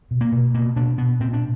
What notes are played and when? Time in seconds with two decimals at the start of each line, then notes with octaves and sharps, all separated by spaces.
0.11 B2
0.21 A#3
0.32 B2
0.54 B2 A#3
0.76 B2 D4
0.98 B2 B3
1.20 A#2 C4
1.33 D4